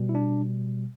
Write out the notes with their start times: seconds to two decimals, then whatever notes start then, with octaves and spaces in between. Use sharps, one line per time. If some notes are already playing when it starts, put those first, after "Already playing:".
Already playing: B2 G3
0.09 E4
0.15 D4